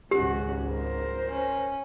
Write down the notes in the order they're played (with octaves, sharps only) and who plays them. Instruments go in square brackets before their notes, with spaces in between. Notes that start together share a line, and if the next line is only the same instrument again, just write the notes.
[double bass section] G#1 C#2 G#2 [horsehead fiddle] C#4 F#4 [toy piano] G4
[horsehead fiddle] A#4 C5
[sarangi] C#4